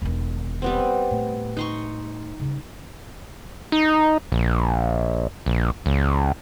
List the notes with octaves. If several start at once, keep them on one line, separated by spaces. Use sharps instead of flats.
E1 D#3
G3 B3 C4
A2
D#4 C6 C#6
G2 C#3
D#4
A#1
A#1
C#2